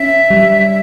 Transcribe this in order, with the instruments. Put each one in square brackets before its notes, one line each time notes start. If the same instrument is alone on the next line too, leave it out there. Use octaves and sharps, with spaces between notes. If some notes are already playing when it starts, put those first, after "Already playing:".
Already playing: [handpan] C#4 [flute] E5
[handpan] G3